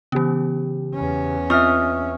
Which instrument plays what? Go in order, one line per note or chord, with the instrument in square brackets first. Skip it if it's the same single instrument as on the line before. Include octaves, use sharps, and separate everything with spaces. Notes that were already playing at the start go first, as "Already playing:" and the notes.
[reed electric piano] C#3 G4 [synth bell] E3 B3
[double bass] E2 C#4
[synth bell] C4 F4 D#5 [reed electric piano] E5 C#6 [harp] D#6 F6